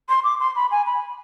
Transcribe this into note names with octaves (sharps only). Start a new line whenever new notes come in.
C6
D6
C6
B5
G#5
B5